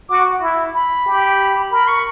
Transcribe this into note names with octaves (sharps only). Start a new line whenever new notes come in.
F#4 D6
E4
B5
G4
A#4 B5
C#6